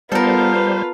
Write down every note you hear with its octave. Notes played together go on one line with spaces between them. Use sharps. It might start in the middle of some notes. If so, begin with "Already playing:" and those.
G3 B3 F4 A4 A#4 C5 F5
B4